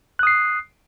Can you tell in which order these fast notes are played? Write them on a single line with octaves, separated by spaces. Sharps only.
F#6 D#6 C7